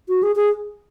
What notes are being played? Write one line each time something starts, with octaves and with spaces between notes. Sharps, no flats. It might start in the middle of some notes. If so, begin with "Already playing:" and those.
F#4
G#4
G#4